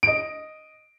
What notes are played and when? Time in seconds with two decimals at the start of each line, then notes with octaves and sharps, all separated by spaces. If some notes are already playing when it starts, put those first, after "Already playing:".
0.03 D#5 D7